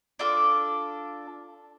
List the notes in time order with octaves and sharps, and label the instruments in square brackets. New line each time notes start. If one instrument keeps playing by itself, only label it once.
[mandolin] D4 F4 A4 D6